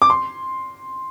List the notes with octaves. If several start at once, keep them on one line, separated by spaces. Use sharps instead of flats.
D6
C6